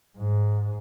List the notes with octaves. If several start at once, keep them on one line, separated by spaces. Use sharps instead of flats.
G#2